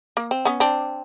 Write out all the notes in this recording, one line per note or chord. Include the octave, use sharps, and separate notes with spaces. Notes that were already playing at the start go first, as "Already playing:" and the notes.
A#3
C4
B3 C#4
C4 D4